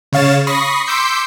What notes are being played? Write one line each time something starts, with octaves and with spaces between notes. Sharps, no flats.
C#3 C#5 F5 A6 E7
B5 C#6 D#6 A#6 C7
C6 D6 E6 G6 B6 C#7